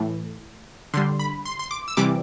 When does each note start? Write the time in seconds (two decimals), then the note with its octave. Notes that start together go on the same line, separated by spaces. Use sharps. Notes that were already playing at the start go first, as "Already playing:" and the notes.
Already playing: A2 E3 A3
0.94 D3 G3 C6
1.19 B5
1.45 C6
1.59 C6
1.71 D6
1.88 E6
1.97 C3 E3 G3 D6